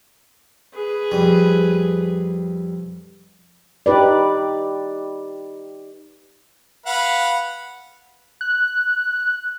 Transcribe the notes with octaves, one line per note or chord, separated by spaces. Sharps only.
G#4 B4
F2 G3
D#4 G4 B4 D5
B4 F5 F#5
F#6